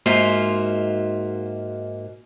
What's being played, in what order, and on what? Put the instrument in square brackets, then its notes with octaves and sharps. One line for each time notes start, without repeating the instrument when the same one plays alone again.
[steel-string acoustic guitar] G#2 A#3 F4 F#4 E5